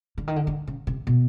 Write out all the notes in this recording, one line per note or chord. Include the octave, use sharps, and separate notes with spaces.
D3
D#3
D3
D3
C#3
C3
B2